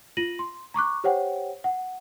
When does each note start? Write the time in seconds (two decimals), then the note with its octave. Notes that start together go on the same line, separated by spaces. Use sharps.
0.17 F4 A#6 D#7 F#7
0.39 C6
0.74 A#5 C#6 D6 F#6
1.04 G4 C5 C#5 F#5 G5
1.64 F#5